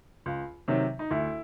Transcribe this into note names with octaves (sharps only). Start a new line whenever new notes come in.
C#2
C3 D#3 F#3
D#4
D2 E4